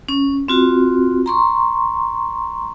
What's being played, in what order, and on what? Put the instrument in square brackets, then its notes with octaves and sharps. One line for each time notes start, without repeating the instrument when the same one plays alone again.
[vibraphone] C#4
C4 F4 F#4
A#5 C6 C#6